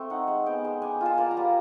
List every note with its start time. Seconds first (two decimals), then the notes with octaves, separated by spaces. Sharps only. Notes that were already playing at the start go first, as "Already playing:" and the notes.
Already playing: A3 C4
0.10 D#4 F#5
0.28 G#3
0.46 B3 G5
0.64 G#3
0.82 D4 G#5
1.01 F4
1.06 A5
1.18 A#3
1.31 A#5
1.37 G3